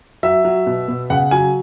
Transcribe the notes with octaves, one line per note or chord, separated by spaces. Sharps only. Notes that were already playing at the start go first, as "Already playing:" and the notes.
F#3 E5
F#3
B2
B2
C#3 F#5
F#3 G#5